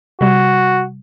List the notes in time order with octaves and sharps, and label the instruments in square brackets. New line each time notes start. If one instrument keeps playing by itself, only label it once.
[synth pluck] C3 G3 [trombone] F#4